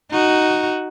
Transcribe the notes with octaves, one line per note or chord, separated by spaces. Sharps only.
D#4 F#4